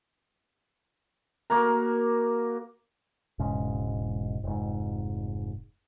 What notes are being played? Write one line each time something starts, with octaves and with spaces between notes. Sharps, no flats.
A#3 F#4 A#4
E1 G#2 C#3
F1 G#2